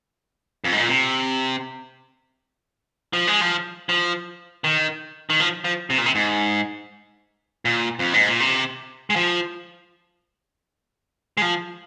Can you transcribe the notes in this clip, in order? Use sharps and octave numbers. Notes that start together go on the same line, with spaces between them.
F2
G#2
A#2
C3
F3
G#3
F3
F3
D#3
D#3
F3
F3
C3
A#2
C3
G#2
A#2
F2
G#2
A#2
C3
G#3
F3
G#3
F3